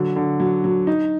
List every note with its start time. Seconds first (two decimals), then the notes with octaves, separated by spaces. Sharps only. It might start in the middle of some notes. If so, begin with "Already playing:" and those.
Already playing: D3 F#3
0.16 D3
0.40 F#3
0.64 F#3
0.87 D#4